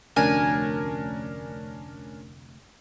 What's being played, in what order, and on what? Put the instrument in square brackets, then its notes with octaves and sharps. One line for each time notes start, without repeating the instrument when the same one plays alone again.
[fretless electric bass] F1 D2 [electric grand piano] C#4 D4 A#4 [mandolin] G#5